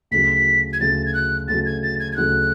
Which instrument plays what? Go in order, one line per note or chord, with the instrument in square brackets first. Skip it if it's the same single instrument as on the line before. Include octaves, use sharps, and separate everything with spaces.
[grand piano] D2 C#3 F#3 [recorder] B6
[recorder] G#6
[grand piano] D2 C#3 F#3 [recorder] A6
[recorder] G#6
F#6
[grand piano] D2 C#3 F#3 [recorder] A6
[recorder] G#6
A6
G#6
G#6
[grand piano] D2 C#3 F#3 [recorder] F#6